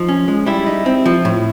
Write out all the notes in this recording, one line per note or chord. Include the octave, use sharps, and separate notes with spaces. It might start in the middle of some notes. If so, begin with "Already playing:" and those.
Already playing: F3 D#4
C#4
G#3
G3 E4
D#4
C4
F3
A2